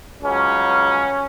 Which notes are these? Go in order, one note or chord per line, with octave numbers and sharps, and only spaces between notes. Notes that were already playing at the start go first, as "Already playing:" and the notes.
C#2 C#3 F#3 C#4